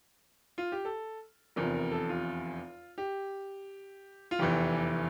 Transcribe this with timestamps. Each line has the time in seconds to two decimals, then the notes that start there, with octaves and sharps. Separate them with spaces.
0.58 F4
0.72 G4
0.85 A4
1.56 F1 E2 C3 F3 A#4
1.74 A#4
1.92 A4
2.09 F4
2.98 G4
4.31 F4
4.39 F1 E2 E3 G4